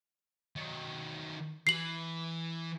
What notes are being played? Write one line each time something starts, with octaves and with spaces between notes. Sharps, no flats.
D#3 F#3
E3 C7 F#7